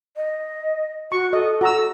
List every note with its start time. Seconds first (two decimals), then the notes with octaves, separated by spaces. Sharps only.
0.16 D#5
1.12 F#4 C#6
1.33 A4 D#5
1.61 F#4 A#5 E6